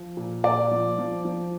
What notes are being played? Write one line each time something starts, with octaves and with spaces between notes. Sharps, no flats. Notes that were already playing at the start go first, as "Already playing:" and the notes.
Already playing: F3
A#2
A#2 D5
F3
F3
F3